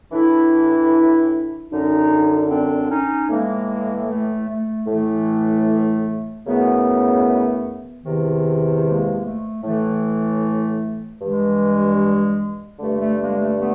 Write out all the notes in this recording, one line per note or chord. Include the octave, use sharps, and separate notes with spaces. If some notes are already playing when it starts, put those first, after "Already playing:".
A2 E3 D4 E4
F#2 D3 C#4 D#4
C4 D4
C#4 D#4
A2 E3 G#3 A#3
A3
A3
A2 A3
E3
F#2 C#3 E3 A3 B3
E2 C3 D#3
G#3 A#3
A3
A2 E3 A3
G2 E3 G#3
G2 D3 A3
A3
G#3 A#3
A3
A3 B3